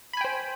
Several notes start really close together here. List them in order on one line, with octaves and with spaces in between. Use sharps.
B5 G#5 G5 C5